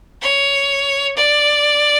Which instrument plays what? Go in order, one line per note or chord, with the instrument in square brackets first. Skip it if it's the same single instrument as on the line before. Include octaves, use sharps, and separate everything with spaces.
[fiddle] C#5
D5